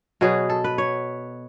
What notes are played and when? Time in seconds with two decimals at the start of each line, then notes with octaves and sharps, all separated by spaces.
0.21 B2 F#3 B3 G#4
0.49 A4
0.64 B4
0.78 C#5